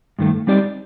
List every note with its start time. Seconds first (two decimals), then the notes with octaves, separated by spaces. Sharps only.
0.19 G2 D#3 A3
0.47 G3 C4 D#4 G4 D5